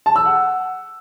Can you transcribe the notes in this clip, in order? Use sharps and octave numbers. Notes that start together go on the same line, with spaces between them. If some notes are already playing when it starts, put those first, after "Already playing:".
A5
E6
F#5